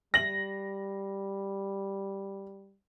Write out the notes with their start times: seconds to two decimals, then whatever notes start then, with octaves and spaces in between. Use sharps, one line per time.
0.14 G3 A#6 F#7